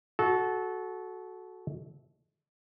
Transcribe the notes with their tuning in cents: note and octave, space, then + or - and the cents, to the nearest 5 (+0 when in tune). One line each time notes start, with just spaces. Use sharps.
F#4 +0 A4 -25